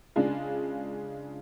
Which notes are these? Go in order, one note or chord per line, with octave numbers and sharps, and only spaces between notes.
C#3 G#3 D4 F4